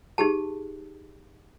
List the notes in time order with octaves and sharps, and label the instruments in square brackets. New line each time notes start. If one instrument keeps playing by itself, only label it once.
[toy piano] D#4 G4 G#4 A5